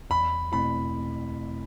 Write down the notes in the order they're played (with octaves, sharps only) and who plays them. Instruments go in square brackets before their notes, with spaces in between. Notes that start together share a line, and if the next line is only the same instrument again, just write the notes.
[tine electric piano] E2 [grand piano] B5
[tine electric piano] B2 A3 C4 E4 [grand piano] B5